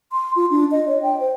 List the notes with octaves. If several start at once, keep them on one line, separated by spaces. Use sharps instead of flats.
C6
F4
D4
D#5
C#5
G5
C5